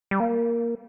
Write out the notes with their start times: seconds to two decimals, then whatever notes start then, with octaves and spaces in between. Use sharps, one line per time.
0.11 G3
0.20 A#3